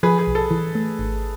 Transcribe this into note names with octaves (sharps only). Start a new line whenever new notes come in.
F3 G#4 B4
G#4
B1
A4
E3
A3
G#1